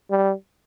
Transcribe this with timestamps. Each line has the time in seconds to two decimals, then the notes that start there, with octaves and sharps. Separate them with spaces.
0.11 G3